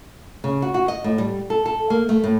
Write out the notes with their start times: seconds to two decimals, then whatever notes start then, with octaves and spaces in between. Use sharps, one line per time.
0.44 C#3
0.62 F#4
0.74 F#4
0.88 D#5
1.04 A2
1.18 G3
1.50 A4
1.66 A4
1.90 A#3
2.09 A3
2.24 A2